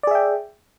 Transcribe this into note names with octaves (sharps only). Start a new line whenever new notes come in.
G#4 D5 E5 G5